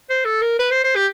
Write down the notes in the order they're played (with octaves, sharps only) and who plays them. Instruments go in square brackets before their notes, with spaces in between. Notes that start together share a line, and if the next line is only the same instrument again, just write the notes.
[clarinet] C5
A4
A#4
B4
C5
C5
G4